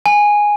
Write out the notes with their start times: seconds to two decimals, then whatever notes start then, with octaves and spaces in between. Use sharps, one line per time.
0.06 G#5